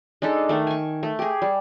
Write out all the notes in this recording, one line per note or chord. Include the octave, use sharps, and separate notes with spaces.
G#3 D4 D#4 A4
D#3 A3
G#5 C#6
A3
G4 G#4
G3